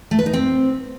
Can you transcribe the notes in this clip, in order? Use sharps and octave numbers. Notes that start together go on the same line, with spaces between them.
A3
B4
D#4
C4